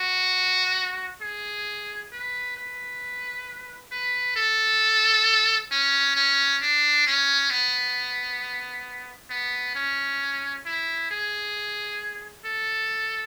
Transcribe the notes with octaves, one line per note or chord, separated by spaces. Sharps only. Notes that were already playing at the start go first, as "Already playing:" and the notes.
Already playing: F#4
G#4
B4
B4
B4
A4
C#4
C#4
D4
C#4
B3
B3
C#4
E4
G#4
A4